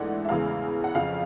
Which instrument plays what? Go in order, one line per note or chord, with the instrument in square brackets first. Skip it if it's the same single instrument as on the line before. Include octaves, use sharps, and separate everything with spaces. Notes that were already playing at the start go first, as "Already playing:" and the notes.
Already playing: [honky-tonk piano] G#2 E3 A3 D4 F#5
E5
E2 C#3 E3 G#3 F5
F#5
F2 C#3 F3 F5